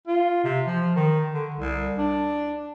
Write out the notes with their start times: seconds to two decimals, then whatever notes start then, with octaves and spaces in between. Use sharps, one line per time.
0.07 F4
0.44 C3
0.67 F3
0.96 D#3
1.34 D3
1.55 C2
1.98 D4